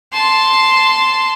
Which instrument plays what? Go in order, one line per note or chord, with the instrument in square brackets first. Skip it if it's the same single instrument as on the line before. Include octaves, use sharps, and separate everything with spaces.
[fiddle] A5 C6